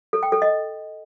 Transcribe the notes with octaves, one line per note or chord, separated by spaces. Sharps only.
A4
G5
A4
D#5